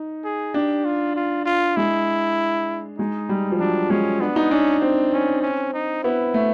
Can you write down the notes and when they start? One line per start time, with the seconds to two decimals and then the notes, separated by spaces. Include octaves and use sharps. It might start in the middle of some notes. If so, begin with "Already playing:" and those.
Already playing: D#4
0.24 G#4
0.54 D4 G4
0.85 F4
1.16 F4
1.46 F4
1.76 G#3 E4
2.98 G#3 D#4
3.29 G3
3.52 F3
3.60 F#3 D4
3.90 G#3 C#4
4.21 B3 D4
4.36 D#4
4.51 C#4 D4
4.82 C4
5.13 C#4
5.42 C#4
5.74 D#4
6.03 B3 E4
6.34 A3